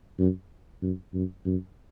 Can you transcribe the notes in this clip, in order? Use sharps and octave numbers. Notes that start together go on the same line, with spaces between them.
F#2
F#2
F#2
F#2